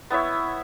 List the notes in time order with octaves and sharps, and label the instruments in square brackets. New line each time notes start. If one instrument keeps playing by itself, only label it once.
[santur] B3 E4 C#5 E5